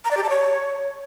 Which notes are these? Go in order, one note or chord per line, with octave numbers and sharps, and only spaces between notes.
A#5
D5
G4
A5
C#5